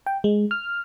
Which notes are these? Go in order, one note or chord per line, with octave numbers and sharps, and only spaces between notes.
G5
G#3
F6